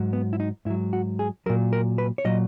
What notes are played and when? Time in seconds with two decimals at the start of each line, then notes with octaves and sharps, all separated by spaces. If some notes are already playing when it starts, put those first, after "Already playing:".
Already playing: G#2 F#3
0.13 B3
0.33 E4
0.40 D#4
0.65 G#2 E4
0.70 F#3
0.93 F#4
1.19 G#4
1.46 F#3 A#4
1.49 A#2
1.73 A#4
1.98 B4
2.18 C#5
2.25 A#2 F#3 D#5